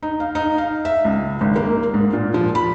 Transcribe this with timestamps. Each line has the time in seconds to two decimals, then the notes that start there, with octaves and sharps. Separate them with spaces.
0.03 D#4
0.20 F5
0.35 D#4
0.58 F5
0.85 E5
1.05 C#2
1.41 G#1
1.56 A#3
1.94 G#2
2.13 A#2
2.34 F3
2.55 B5